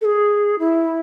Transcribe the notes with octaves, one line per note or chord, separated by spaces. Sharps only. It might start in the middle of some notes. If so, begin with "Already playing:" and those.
A4
G#4
E4